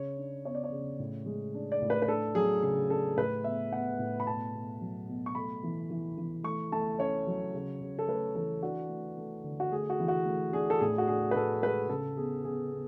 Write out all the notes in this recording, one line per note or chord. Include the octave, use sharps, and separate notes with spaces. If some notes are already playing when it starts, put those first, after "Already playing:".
Already playing: C#3 C#5
D4
B3 C#5
D5
C#5
C#3
A2
G#3
D4
D5
A2
B4
B4
D4 A4
F#3 G#4
C#3 G#4
D4 A4
A2 B4
B3 E5
B3 F#5
A2
B5
B2 A5
B2
F#3
B2
C#6
A3 B5
E3
E3
E3
A3 C#6
A3 A5
C#4 C#5
F#3
C#3
C#3
A4
A3 B4
E3 A4
D4 F#4
A3
A3
D3
F#4
A3 G#4
F#4
E3
F#4
A3
D4 G#4
A4
A2 G#4
F#4
D4 G#4
B4
A2 A4
G#3 B4
C#3 A4
B3 G#4
B3 G#4
B3